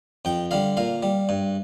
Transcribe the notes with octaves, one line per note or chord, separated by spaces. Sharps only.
F2 G5
D3 G3 F5
A#2 F5
G3
G2